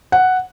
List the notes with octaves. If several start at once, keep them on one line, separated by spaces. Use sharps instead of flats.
F#5